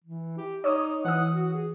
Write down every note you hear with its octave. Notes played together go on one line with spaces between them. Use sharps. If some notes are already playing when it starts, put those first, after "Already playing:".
E3
G4
D#4 C#5 D6 D#6
E3 F#5 D#6
F#4
G#4